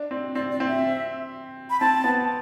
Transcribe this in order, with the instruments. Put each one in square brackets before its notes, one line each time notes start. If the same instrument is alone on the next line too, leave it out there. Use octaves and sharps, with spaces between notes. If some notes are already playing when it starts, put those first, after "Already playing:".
Already playing: [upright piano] D4
C4
[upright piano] C4 [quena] D5
[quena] D5
[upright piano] C4
[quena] E5
B5
[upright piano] C4 [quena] A5
[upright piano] B3